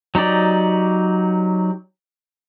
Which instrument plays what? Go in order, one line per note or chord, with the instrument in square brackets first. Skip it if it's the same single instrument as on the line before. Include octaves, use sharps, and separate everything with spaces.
[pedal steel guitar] F#3 D#4 G4 D5